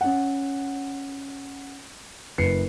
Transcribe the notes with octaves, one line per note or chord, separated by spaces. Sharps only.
C#4 F#5
F#1 B4 C7 C#7